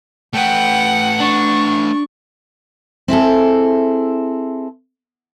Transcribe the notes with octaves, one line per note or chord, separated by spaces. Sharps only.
A3 B4 F#5 G5
D4 C#6
C4 E4 G#4 A4